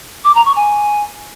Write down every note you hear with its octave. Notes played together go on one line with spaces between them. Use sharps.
D6
A#5
C#6
G#5